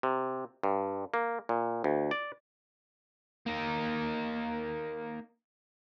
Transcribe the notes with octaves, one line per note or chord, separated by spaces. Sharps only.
C3
G2
A#3
A#2
D2
D5
A#3 D#4